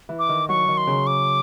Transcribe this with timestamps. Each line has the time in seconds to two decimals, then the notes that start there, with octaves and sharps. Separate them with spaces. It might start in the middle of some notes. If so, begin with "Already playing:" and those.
0.09 E3
0.19 D6
0.29 D#3
0.49 F#3 C#6
0.68 D#3
0.77 C6
0.87 C#3
1.07 D6